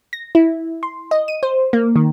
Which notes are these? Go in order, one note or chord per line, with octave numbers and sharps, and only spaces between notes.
A#6
E4
C6
D#5
D#7
C5
A#3
D#3